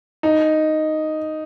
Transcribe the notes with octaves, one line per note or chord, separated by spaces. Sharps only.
D#4